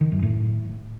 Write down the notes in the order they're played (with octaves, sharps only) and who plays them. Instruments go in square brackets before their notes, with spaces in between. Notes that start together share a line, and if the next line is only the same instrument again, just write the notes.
[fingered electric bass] D#3
F#2
A2